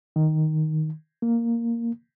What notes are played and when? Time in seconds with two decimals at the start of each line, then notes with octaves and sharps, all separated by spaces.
0.16 D#3
1.22 A#3